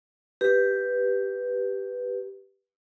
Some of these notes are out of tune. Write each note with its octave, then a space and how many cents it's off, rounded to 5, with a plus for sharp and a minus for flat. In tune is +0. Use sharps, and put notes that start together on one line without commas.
G4 +0 B4 +0